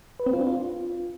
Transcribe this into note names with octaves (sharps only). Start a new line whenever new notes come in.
B4
C4
F4
D4
F4